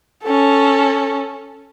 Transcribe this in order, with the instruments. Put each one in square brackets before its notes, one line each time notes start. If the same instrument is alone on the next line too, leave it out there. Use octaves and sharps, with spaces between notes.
[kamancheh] C#4 A4